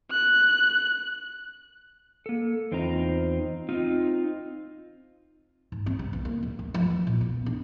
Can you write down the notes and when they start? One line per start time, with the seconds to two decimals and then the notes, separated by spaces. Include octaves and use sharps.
0.11 F#6
2.26 A#3 A4
2.72 E2 C4 D#4 F4 A#5
3.69 C4 D#4 F4
5.72 G#2
5.86 C4
5.99 C2
6.13 B3
6.25 A#3
6.43 D1
6.59 A3
6.74 F3
6.90 E3
7.07 A#2
7.21 B3
7.46 D4